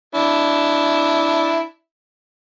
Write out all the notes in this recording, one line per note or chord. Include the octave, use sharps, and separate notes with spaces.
D4 E4